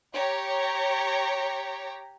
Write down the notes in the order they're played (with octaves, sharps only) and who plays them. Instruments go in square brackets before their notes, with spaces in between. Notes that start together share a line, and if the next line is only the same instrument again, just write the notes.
[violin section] G4 C#5 A#5